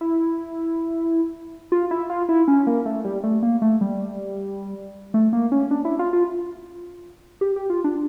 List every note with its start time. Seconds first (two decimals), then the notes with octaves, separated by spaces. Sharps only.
0.01 E4
1.72 F4
1.91 E4
2.10 F4
2.29 E4
2.48 C#4
2.67 A#3
2.86 A3
3.05 G3
3.24 A3
3.43 A#3
3.62 A3
3.81 G3
5.14 A3
5.33 A#3
5.52 C#4
5.71 D4
5.85 E4
5.99 F4
6.13 F4
7.41 G4
7.56 G4
7.70 F4
7.84 D4